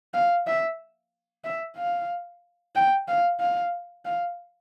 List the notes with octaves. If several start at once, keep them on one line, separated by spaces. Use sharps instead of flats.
F5
E5
E5
F5
G5
F5
F5
F5